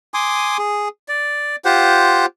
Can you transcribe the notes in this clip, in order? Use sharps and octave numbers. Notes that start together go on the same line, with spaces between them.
G#5 C6 D6 D#6
G#4
D5
F4 G4 C5 F#5